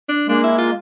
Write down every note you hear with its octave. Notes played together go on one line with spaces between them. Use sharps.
D4
G#3 A#3 D4
E4
F4